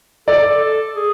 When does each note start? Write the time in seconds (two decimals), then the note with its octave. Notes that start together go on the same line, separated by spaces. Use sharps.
0.28 A4 D5
0.50 A4
0.96 G#4